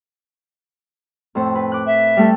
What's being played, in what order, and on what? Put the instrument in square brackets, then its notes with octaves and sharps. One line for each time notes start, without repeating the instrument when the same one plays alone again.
[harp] F2 A2 C5
B4
D6 F#6
[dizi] E5
[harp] G3 A3 A4